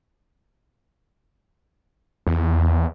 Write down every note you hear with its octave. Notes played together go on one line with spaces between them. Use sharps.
E2